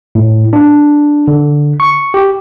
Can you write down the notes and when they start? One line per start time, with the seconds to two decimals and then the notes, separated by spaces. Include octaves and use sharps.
0.15 A2
0.53 D4
1.28 D3
1.80 C#6
2.14 G4